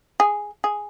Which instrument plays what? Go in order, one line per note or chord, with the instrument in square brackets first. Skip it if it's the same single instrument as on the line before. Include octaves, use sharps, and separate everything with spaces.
[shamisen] G#4
G#4